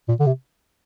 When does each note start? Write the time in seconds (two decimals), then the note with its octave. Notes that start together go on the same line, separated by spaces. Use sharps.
0.08 A#2
0.20 D3
0.26 C3